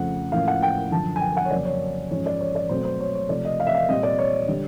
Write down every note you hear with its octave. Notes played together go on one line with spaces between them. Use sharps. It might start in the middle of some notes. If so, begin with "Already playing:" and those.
Already playing: F2 C#3 F3 A3 F#5
A2 F3 A#3 C#4 F5
F#5
G5
F#2 D3 F3 A5
G#5
G5
F#5
C#5
F2 C#3 F#3 A#3 C#4 D5
C#5
G#2 F3 G#3 C#4 C#5
D5
C#5
D5
B2 F#3 A3 C4 C5
C5
C#5
C#5
C3 F3 A3 D5
D#5
F5
E5
F5
A#2 G3 C4 D#5
D5
C#5
D3 G3